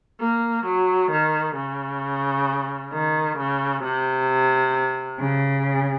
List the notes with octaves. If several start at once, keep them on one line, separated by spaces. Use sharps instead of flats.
A#3
F#3
D#3
C#3
D#3
C#3
C3
C#3